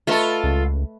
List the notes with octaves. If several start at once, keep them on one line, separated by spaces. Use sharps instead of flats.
A3 F4 A4 B4 D#5
C#2